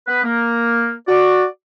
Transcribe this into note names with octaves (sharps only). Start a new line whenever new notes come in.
B3 B4
A#3
F#4 D5